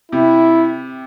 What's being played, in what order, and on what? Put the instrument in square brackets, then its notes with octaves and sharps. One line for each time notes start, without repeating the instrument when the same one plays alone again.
[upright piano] C3 [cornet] E4